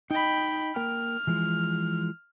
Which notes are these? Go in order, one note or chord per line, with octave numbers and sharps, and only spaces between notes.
D#4 D#5 G5 B5
A#3 A#4 G5 F6
E3 F3 G#3